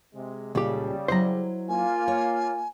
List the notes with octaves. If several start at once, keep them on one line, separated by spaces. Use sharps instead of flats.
C3 G#3
C#2 A#2 C#3 G3 G4 A4
F#3 E4 C5 D#5 A#5
A#3 F4 G#5
C#5